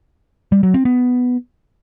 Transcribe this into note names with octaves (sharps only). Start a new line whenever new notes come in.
G3
F#3
C4
B3